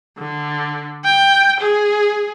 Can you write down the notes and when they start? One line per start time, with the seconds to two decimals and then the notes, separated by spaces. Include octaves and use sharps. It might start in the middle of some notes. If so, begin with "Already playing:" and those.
0.19 D3
1.04 G5
1.61 G#4